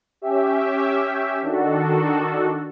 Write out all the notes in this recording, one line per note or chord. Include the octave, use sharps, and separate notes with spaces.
C#4 G4 E5
D#3 D4 F#4 A4